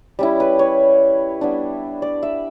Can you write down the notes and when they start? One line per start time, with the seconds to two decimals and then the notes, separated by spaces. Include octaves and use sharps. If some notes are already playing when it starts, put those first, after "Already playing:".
0.19 G3 C#4 E4
0.40 B4
0.59 C#5
1.41 G3 B3 D4
2.02 D5
2.23 E5